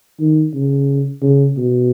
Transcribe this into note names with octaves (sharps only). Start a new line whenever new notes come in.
D#3
C#3
C#3
B2